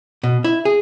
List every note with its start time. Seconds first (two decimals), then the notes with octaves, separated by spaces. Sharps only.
0.23 B2
0.44 E4
0.65 G#4